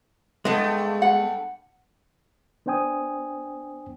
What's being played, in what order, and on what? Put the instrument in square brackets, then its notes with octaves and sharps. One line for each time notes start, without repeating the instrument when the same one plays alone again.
[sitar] G2 A3 [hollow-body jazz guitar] G#3 B3
[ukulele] F#5
[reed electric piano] B3 D4 C5 G5 G#5 D#6